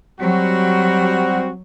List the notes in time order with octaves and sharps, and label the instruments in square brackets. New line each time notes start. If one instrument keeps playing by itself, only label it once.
[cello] F#3 [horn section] G3 C4 F#4